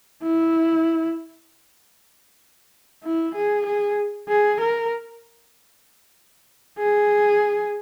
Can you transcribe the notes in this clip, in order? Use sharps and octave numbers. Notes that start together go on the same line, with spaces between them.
E4
E4
G#4
G#4
G#4
A#4
G#4